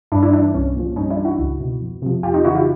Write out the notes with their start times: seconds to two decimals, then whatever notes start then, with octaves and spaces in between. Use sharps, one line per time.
0.12 G2 D4 E4
0.22 D4 E4
0.33 E3 D4
0.54 C2 C#4
0.75 A#2 F3
0.96 G2 C#4 D#4
1.10 D4 E4
1.18 E3
1.25 E4 F#4
1.39 C#2
1.60 B2
1.81 F2
2.02 C3 F3
2.23 F2 F4 G4
2.34 D#4 F4
2.44 C#3 E3 E4 F#4
2.55 F4 G4